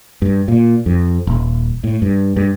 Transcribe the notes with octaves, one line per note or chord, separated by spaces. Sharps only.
G2
A#2
F2
D#1
A2
G2
G2